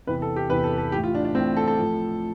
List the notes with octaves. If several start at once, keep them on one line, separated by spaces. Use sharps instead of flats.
E2 C3 E3 B4
A4
G4
E2 C3 E3 B4
A4
A4
A2 E3 G4
F4
D4
D4
A2 E3 C4
A4
A4
A2 F3